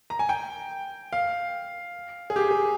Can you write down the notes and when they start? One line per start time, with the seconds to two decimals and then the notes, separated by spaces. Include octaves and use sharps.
0.10 A#5
0.19 G#5
0.29 G5
1.13 F5
2.30 G#4
2.36 G4
2.51 G#4